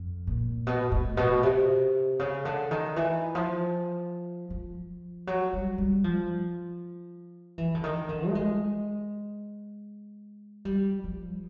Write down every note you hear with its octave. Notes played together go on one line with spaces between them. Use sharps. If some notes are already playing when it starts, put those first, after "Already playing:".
Already playing: F2
A#2
B2
A2
B2
C3
C#3
D3
D#3
E3
F3
F3
F#3
G3
G3
F3
E3
D3
D#3
D3
A3
G#3
G3
F3